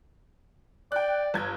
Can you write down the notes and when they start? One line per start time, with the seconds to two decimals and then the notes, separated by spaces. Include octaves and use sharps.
0.92 D5 G5 F#6
1.34 G1 G#6